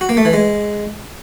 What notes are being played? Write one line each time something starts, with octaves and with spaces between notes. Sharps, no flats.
F#4
A#3
A3
E3
G#3